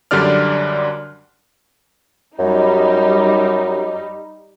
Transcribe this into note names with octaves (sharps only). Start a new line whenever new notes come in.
F#2 D3 G3 D4 D5 F6
F#2 G3 D#4